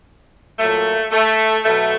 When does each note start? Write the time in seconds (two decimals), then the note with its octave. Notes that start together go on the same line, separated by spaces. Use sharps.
0.59 A#2 F#3 A3
1.12 A3
1.64 B2 F#3 A3